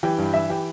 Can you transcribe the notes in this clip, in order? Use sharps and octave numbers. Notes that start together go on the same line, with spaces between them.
E3 G4 G5
G2
E3 E5
E3 G4 G5